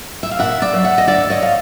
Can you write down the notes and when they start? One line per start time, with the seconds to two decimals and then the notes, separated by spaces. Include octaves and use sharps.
0.23 E5
0.31 F5
0.39 A#2 E5 F#5
0.62 D5 E5
0.74 F#3
0.84 E5 F#5
0.98 D#5
1.07 D2 D5 E5
1.30 C#5 D#5
1.42 C3 F5